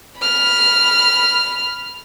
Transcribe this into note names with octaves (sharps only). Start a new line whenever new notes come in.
B5 F6